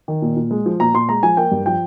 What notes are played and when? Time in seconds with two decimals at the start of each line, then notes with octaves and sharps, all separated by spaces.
0.08 D#3
0.22 A#2
0.37 A#2
0.51 G#3
0.66 F3
0.80 A#2 A#5
0.94 A#2 C6
1.09 G#3 A#5
1.23 F3 G#5
1.37 A#3 G5
1.52 G2
1.66 F3 G5